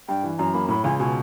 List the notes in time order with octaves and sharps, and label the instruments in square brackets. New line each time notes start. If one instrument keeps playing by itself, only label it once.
[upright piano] G2 [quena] G5
[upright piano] E3
[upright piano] F#2 [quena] A#5
[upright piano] A#3 [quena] B5
[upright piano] A2 [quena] B5
[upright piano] C#2 [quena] G#5
[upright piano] B2 [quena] G#5